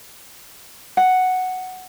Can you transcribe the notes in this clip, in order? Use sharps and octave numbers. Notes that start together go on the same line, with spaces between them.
F#5